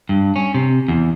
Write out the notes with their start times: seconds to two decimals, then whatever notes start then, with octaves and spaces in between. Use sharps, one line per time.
0.09 G2
0.36 C#4
0.54 C3
0.88 E2